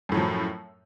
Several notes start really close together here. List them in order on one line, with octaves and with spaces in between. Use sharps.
F#2 A2 F#3 F3